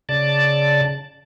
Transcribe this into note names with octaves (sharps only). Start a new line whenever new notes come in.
C#3 D5 A5